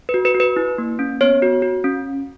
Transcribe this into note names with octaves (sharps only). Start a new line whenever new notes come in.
B4
F#4
B4
F#4
B4
E4
A#3
C#4
B3 C#5
F#4
F#4
C#4